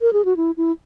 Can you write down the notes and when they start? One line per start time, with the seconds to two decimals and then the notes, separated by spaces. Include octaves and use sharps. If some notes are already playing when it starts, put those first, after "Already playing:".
0.02 A#4
0.13 G#4
0.25 F#4
0.37 E4
0.57 E4